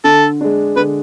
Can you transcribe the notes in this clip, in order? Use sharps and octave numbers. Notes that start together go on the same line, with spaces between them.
D3 A4
G#3 D4
D3 B4